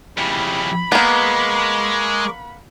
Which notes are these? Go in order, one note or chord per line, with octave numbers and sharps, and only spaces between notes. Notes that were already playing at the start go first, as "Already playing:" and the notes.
F2 C#3 E4 G4 B5
G#3 A#3 B3 A#4 C#6 D6